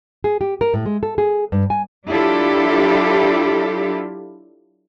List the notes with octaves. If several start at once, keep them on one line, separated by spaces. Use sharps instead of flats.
G#4
G4
A#4
A2
G#3
A4
G#4
G2
G#5
F#3 D4 E4 F4 G4 A4